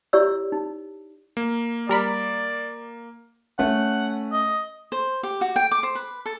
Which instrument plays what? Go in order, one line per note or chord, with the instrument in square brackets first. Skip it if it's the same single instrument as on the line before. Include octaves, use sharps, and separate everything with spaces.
[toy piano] E4 G4 C#5 D5 C#6 E6
D#4
[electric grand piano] A#3
[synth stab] G3 A#4 B5 [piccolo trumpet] D5
[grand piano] A3 C#4 [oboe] F#5
[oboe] D#5
[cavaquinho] C5
G4
F#4
G5
D6
C5
B4
A4